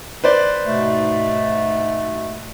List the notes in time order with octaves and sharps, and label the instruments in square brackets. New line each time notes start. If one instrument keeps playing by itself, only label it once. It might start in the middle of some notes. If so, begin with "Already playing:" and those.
[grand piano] B4 C5 D5
[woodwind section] G#2 B2 A3